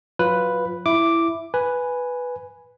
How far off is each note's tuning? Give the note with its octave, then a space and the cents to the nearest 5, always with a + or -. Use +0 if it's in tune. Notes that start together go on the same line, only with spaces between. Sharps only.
F#3 -20 F4 +0 B4 +0
E4 +10 E5 +0 D6 +0
B4 +0 G#5 +0